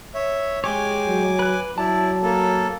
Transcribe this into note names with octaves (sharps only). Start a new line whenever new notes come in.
C#5 E5
G#3 G4 C#5 G#5 D6
F#3
B4 F#6
F#3 E4 D5 A5
A#3 A4